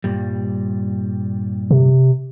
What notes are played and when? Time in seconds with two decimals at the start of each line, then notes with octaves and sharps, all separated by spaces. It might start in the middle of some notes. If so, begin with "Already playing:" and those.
0.04 G2 A#2 G3
1.71 C3